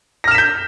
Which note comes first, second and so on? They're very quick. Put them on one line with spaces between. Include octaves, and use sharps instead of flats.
A#6 F6 E7 B6 G6